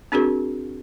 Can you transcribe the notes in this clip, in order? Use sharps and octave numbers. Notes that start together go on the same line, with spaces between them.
C4 D4 F#4 G#4 A#4